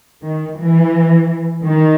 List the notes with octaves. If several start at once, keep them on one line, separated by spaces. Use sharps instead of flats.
D#3
E3
D#3